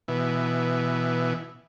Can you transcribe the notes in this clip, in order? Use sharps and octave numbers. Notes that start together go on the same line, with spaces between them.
B2 E3